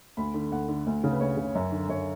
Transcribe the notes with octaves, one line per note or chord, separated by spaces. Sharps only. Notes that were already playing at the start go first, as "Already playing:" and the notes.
D2 B5
D3
D2 F#5
D3
D2
C#3
B4
D2 C#5
C#3
F#2
D3
F#2 C#5